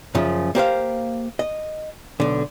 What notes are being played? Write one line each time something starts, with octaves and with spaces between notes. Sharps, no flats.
F#2 C#3 F3
A#3 G4 C5 F5
D#5
B1 D3